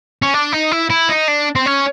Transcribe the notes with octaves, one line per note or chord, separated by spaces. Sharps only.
C#4
D4
D#4
E4
E4
D#4
D4
C4
C#4